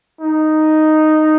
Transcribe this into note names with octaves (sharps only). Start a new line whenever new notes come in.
D#4